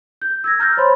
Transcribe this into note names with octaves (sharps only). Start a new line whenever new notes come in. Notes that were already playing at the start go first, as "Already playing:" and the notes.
G6
E6 G#6 A#6
A#5 F6 G6 A6 A#6
C5 C#5 B5 C6